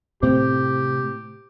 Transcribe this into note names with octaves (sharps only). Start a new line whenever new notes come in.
A2 C3 A3 C4 G4